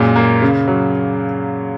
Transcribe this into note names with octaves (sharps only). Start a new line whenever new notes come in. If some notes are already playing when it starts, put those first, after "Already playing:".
Already playing: F#2 A#2 G#3
A#3
C#3
F#3